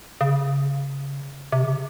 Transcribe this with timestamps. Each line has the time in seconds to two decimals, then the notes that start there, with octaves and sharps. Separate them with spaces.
0.21 C#3
1.52 C3
1.64 C#3